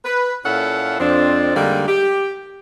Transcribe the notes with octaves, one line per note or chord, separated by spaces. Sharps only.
B4
A#2 C#4 E4 A4 F5 F#5
F2 C4 D4
D3 G3 G#3 A#3 D#4
G4